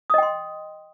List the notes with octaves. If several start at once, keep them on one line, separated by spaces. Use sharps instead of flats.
D#5 G5 C6 D#6